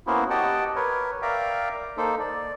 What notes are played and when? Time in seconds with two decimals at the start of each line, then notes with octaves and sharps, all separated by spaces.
0.07 A#3 B3 C#4 E4 F#4 C5
0.30 G4 D#5 F#5 G5 A5
0.76 A#4 B4 C#5
1.22 A#4 D5 E5 F5 G5 A#5
1.97 A#3 D#4 A4 C5
2.19 D5